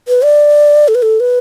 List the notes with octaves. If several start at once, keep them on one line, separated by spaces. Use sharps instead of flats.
B4
D5
A4
B4
A4
B4